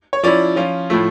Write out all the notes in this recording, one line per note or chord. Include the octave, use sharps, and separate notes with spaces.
C#5
F3 C#4 E4 D5
F3 C#4 F4
A2 F3 A3